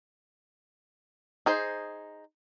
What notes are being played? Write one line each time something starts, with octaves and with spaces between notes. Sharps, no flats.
D#4 G#4 C5